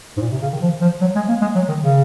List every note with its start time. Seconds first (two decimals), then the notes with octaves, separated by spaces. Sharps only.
0.17 G#2
0.22 A#2
0.31 C3
0.42 C#3
0.52 D#3
0.62 F3
0.81 F3
1.01 F#3
1.16 G#3
1.28 A#3
1.41 G#3
1.55 F#3
1.69 D#3
1.82 C#3